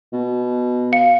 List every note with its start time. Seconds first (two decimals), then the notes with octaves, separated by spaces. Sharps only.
0.13 B2
0.92 F5 C#7